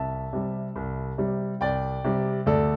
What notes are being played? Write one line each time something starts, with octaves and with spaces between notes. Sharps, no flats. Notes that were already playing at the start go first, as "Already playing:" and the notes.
Already playing: C2 E5 A5
C3 G3
C2
C3 G3
C2 D5 G5
C3 G3
D2 A4 D5